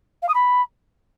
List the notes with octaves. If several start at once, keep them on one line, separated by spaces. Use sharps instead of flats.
F5
D#6
B5